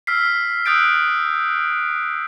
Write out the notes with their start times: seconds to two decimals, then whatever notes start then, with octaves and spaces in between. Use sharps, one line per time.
0.07 E6 F6 B6 C7
0.66 D#6 E6 F#6 G6 A6 D7